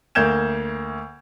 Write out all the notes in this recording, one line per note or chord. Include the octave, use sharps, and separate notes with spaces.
D2 A#3 G6 G#6 E7